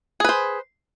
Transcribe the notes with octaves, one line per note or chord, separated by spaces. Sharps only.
G#4 B4 C5